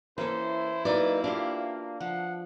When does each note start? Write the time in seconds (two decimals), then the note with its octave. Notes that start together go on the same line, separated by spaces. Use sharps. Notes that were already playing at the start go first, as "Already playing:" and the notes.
0.18 E3 A#3 C#4 E4 A4 C5
0.85 F#3 A#3 B3 D#4 B4 D5
1.24 D4 F4 G4 F5
2.01 F3 F#5